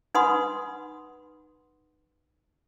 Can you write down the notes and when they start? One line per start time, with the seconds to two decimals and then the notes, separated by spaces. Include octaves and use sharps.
0.14 D#4 B4 F#5 B5 C6 D#6